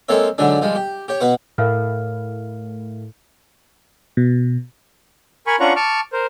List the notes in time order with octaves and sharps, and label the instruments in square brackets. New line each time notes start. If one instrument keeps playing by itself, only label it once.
[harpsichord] G#3 A#3 C4 A4 C#5 E5
G#2 D3 F#3 G#3 D4
F3 G3 G#3
G4
G4 C#5
B2 B4 F#5 C#6
[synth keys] A2 [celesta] A#4 F5 F6
[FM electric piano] B2
[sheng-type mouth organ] A#4 G#5 B5 C#6
C#4 D4 F4 F#5 A#5 C#6
A5 C#6 D6 F6
A#4 C5